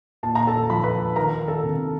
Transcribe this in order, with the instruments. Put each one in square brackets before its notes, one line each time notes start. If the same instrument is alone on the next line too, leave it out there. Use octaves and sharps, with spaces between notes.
[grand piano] A#2 A5
A#5
A4 A5
F3 B5
B4 B5
D#3 A#4 A#5
A4 A5
C3